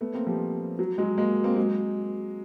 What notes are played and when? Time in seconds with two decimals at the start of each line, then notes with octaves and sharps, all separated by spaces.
0.01 A3 B3
0.14 A#3 C4
0.27 F3 G3
0.79 F#3
0.98 F#3 G#3
1.18 G#3 A#3
1.44 A#3 C4
1.56 F#3 G#3